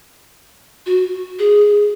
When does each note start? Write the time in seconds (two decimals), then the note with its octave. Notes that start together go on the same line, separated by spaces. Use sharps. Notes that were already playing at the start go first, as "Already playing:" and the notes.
0.86 F#4
1.39 G#4